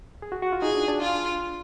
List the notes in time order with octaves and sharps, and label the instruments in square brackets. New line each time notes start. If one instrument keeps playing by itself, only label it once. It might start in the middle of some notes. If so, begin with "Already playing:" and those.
[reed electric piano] G#4
F#4
F#4
F4
[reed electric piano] D#4 [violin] G#4
[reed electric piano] D4
D4
[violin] F4